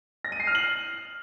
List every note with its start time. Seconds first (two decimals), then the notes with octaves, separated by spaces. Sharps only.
0.25 A#6
0.32 D#7
0.40 C7
0.47 F6
0.55 F#7